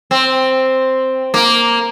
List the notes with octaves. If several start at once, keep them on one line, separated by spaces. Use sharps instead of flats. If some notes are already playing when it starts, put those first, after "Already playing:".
C4
A#3